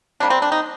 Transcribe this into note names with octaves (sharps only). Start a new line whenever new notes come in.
C3 G3 A#3 D4
C4
D4
D#4